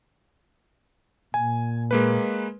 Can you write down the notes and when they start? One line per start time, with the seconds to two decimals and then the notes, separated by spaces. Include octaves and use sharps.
1.34 A#2 G#5
1.91 G#3 A#3 B4